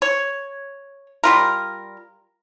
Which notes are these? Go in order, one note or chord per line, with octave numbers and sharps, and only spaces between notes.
C#5
G3 F4 A#4